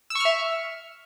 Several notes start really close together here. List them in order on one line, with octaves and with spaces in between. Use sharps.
E6 C#6 F6 E5